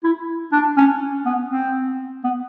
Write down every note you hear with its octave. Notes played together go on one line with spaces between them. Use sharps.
E4
D4
C#4
B3
C4
B3